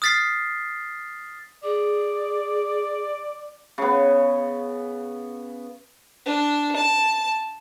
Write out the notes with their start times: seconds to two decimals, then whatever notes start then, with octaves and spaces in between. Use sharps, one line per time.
0.02 D#6 F6 A6 B6 C7
1.64 G#4 D5
3.78 C#3 B3
6.25 D4
6.76 A5